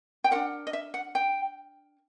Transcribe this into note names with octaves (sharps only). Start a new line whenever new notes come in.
G5
D4 F#4 A#4 F#5
D#5
E5
F#5
G5